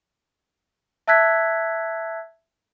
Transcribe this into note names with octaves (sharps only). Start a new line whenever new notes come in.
E5 A5 E6 F#6 G#6 B6